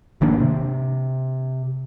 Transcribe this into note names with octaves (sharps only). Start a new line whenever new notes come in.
G#1 D#3 A#3 D4
C3